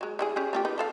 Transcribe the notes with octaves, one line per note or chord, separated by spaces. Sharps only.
F#3 G#3
G3 E4 G#4
C#4 G4 G#4
A3 F4 G4
D#4 B4
C#3 A4 F5